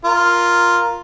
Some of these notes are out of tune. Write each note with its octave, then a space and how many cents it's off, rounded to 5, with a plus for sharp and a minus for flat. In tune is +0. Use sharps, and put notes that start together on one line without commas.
F4 +0 A#4 +0